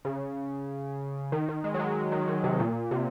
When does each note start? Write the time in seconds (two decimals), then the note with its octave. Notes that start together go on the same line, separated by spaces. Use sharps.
0.05 C#3
1.32 D#3
1.49 D#3
1.64 G#3
1.74 F#3
1.79 G#3
2.12 D#3
2.28 D#3
2.44 C3
2.59 A#2
2.91 C3